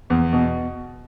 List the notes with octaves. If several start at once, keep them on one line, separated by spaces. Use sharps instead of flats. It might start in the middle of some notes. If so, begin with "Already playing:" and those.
E2
B2